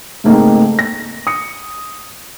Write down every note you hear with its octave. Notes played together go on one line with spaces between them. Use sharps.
G#2 C#3 A3 A#3 C4 D#4
A#6
D#6 C#7